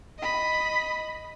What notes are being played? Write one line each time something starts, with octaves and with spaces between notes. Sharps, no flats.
D#5 B5